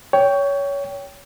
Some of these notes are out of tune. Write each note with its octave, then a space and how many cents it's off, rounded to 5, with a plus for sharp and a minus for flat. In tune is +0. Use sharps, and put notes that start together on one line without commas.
C#5 +20 G5 +0